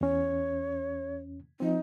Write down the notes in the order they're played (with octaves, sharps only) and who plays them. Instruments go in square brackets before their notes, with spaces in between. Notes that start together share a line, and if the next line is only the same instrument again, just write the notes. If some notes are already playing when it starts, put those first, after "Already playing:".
[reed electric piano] E2 C#4 [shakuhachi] C#5
[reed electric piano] F3 C4 [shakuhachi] D#4